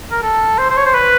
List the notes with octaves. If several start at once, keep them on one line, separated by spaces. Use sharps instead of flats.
A#4
A4
C5
C5
C#5
C5
B4